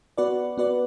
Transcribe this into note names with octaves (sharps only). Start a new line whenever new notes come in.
B3 F#4 B4 D5
B3 F#4 B4 D5